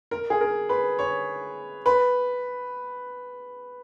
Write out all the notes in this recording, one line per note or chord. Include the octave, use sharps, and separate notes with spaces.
A#4
G#4
A#4
B4
C#5
B4